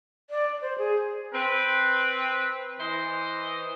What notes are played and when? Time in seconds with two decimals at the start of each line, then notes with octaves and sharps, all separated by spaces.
0.30 D5
0.61 C5
0.78 G#4
1.34 C4 B4
2.80 E3 C5 D#5